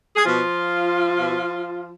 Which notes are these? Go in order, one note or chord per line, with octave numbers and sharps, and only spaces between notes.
G#4
B2 F3 F4
B2